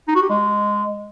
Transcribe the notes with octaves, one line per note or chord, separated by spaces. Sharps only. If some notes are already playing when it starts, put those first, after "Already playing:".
D#4
F#4
G4
G#3